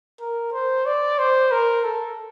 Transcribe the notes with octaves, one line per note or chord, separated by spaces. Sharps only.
A#4
C5
D5
C5
A#4
A4